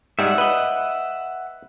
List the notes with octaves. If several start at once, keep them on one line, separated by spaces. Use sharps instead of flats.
G#2 G3 G#3 E5 F#5
B4 D#5